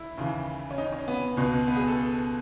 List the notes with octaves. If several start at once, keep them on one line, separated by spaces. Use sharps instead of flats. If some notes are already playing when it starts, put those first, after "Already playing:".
Already playing: E4
D#2 C#3 E3
C#4
D#4
C#4
B3
C#2 B2
B3
G#4
A4